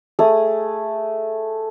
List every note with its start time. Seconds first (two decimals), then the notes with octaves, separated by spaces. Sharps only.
0.19 A3 G#4 D#6